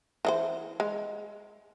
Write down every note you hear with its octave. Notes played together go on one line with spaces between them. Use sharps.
E3 D#4 C5
G#3